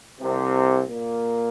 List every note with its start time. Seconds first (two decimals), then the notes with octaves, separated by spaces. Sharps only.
0.20 C2 C3
0.88 A#2 A#3